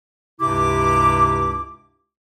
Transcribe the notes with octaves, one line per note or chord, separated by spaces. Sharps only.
C#2 G2 C3 E4 G4 D6